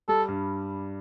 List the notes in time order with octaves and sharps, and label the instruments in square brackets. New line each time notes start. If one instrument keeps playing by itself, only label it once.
[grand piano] G3 [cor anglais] A4
[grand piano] G2